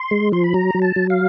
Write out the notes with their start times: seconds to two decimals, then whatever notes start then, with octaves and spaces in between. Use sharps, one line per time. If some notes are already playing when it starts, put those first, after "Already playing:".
Already playing: C6
0.11 G#3
0.32 F3 C6
0.44 B5
0.54 F#3 A#5
0.74 F#3
0.82 A5
0.96 F#3
1.10 F5